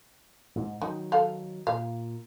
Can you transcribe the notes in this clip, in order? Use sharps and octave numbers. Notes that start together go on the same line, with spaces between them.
G#2
D#3 F#3 D#4
A4 F5
A#2 F5